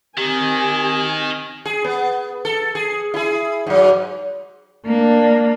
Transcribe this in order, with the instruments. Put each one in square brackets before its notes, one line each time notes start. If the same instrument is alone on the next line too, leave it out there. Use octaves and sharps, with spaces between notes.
[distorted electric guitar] D#3 [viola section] C4 G#5 [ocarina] G4
[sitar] G#4
B3
A4
G#4
E4 G#4
G#2 F#3
[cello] A#3 D4